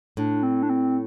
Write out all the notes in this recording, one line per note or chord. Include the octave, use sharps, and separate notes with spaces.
A2 D4
C4
D4
C4